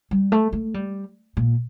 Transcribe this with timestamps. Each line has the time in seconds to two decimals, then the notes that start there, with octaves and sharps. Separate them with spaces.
0.11 G3
0.32 A3
0.53 A3
0.74 G3
1.37 A#2